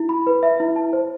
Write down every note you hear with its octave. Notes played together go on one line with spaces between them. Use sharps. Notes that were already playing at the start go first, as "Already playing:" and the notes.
Already playing: E4
B5
B4
E5
E4
A5
C5